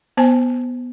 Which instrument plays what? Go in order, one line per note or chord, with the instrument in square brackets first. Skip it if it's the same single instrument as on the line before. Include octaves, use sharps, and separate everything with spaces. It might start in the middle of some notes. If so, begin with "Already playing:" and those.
[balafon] B3 C5 G#5 A5